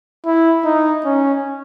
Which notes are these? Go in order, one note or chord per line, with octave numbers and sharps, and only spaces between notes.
E4
D#4
C#4